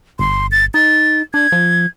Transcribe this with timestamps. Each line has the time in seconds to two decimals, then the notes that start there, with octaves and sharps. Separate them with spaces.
0.19 G1 C6
0.52 A6
0.74 D#4 A6
1.34 D4 G#6
1.52 F3